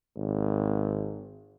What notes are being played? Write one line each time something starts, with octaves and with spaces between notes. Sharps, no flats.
G#1